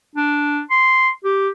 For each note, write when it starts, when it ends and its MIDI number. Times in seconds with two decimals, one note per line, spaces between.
0.16 0.61 62
0.70 1.09 84
1.24 1.49 67